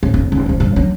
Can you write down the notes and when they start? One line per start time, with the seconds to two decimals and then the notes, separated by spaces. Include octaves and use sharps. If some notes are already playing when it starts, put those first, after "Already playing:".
0.03 A2
0.14 F1
0.32 F1
0.46 E1 F3
0.60 G2 B2
0.76 F#3 D4